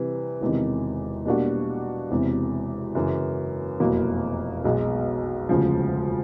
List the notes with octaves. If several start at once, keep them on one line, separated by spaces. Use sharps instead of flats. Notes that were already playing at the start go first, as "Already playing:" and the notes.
Already playing: C3 E3 G3
E1 E2 C3 D#3
B2 G3 A#3 D4 F#4
E1 E2 C3
F#2 C#3 E3
F1 E2 B2 F#3 A#3
B1 B2 G#3
E1 D2 C#3 F3